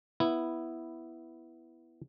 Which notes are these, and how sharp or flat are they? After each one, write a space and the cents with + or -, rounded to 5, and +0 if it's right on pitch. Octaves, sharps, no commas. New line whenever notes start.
B3 +0 E4 +0